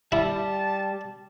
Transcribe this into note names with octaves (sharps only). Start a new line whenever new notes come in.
G3 E4 A5